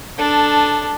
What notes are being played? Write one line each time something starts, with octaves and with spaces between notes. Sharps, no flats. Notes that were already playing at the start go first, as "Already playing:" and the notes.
D4 A4